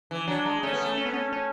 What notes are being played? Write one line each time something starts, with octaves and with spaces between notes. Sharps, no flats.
E3
F#3 D4
G#3
A3 C#4
B3
A3
C#4
B3
C#4
C#4